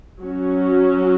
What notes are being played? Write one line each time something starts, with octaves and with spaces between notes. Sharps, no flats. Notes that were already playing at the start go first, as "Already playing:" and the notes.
F#3 C#4 F#4